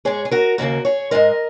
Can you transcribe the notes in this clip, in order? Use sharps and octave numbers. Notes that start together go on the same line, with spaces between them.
G#2 G#3 G#4 C#5
G#4
F#4 A#4
D#2 C#3 A#3 F#4 A#4
G#4 C#5
G#2 G#3 A#4 D#5